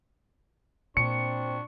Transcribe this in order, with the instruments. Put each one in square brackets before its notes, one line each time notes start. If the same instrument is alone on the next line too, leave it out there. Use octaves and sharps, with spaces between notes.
[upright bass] A#2 [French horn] C4 [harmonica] D4 C#6 [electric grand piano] C#7